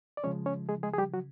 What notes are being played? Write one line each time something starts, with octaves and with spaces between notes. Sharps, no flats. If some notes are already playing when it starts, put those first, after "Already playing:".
D5
C#3 F3 G#3 C#4 C#5
C#4 C#5
G#3 G#4
G#3 G#4
G#4
G3 G4
F#3 F#4